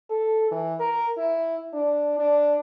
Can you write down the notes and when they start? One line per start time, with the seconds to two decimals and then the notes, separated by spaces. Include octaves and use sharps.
0.10 A4
0.51 E3
0.80 A#4
1.18 E4
1.74 D4
2.19 D4